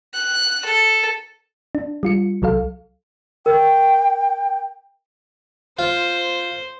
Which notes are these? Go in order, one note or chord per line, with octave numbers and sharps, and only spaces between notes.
F#6
A4
D4
G3 F4 C#7
C2 F#3 A4 F5
A#4 G5
F4 C5